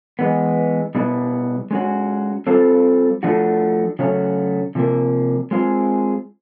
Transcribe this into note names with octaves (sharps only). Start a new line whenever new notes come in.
E3 G#3 B3
B2 G3 B3 E4
G#3 C#4 F#4
G3 C4 F4 A4
F3 A3 D4 F#4
C#3 F#3 A3 C#4
C3 F3 A#3
G#3 C4 F4 G#4